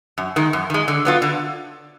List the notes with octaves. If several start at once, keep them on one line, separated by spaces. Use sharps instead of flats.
F#2
D#3 G#3
F#2
D#3 G#3
D3
F#3 B3 F4
D3